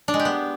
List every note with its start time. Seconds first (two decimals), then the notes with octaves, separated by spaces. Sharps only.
0.08 D4
0.14 G#3
0.19 G4
0.25 B3